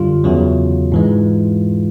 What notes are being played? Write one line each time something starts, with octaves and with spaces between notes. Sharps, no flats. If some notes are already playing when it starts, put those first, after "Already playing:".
Already playing: F#2 D3 G3 F4
E2 C#3 F#3
G#2 E3 G#3